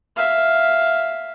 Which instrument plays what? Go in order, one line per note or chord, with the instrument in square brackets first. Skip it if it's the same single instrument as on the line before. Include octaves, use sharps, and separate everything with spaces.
[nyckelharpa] E5 F5